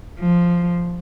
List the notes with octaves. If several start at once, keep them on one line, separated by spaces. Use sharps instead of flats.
F3